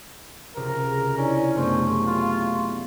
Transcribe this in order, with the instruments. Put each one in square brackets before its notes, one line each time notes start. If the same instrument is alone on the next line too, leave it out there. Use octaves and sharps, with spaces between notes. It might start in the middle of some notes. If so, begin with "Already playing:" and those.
[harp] C#2 C3 [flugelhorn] A#4
[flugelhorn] C#4 [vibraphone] D4 E4 D5
[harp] F#1 C2 [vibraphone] A3 B3 C#6 [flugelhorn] C5
[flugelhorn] F4